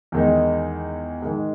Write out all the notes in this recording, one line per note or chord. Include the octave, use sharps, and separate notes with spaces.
E2 D#3 G#3 D#4
G#2 D#3 G#3